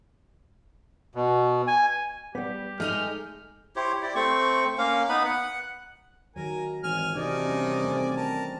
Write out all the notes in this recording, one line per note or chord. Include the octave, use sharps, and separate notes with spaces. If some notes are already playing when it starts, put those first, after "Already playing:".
B2
G#5
G3 B3 G4
G#3 A3 D#4 G#4 F6
E4 G4 C5 C#5
E4 G4 D5
A3 C4 C5 C#6
A#3 C#4 F5
B3 D#4 B4 B5
F#5
D#3 F#3 A#4 G#5
G#1 E3 G#5 F6
C3 D#3 D4 D5 D#5 G#5
G3 C#4
A3 C4
A#4 A5